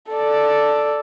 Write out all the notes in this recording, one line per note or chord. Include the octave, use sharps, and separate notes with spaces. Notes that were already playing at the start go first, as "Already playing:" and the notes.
A4 D5